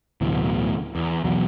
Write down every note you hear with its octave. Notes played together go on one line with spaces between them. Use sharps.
D1 D2 B2 E3
E2
B1 E2 F#3